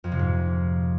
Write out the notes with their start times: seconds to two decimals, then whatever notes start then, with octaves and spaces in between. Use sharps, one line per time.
0.04 F2
0.12 C3
0.19 G#2